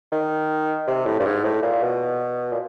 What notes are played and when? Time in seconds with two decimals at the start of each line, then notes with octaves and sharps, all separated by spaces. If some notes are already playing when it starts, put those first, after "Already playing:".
0.12 D#3
0.87 C3
1.06 A2
1.20 G2
1.26 G#2
1.44 A2
1.63 A#2
1.82 B2
2.52 A#2